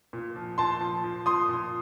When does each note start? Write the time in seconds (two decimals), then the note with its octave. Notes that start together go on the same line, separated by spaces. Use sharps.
0.13 A#2
0.36 F3
0.58 A#2 A5 C6
0.81 F3
1.04 F3
1.26 A#2 C6 D#6
1.49 A#2